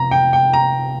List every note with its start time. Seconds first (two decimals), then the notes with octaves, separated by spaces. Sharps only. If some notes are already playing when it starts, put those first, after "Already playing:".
Already playing: F1 A#5
0.11 G5
0.33 G5
0.53 A#5